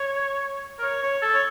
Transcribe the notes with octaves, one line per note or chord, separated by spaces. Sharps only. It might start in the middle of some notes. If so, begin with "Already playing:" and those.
Already playing: C#5
A#4
C#5
C#5
A4
C#5